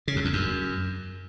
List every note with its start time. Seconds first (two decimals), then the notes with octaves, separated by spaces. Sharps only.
0.08 C#3
0.16 F2
0.25 E2
0.33 F#2